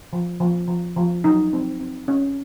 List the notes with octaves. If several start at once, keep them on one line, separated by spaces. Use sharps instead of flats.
F3
F3
F3
F3
F#3 D#4
C4
C4
C#4